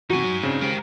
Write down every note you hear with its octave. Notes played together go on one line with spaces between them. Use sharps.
E2 A2 C3 D#4 F#4 G#5
F#3
C#3 C4 D4
G#3 G4 A#4 C5 G5